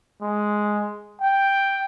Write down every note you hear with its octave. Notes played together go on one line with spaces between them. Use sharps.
G#3
G5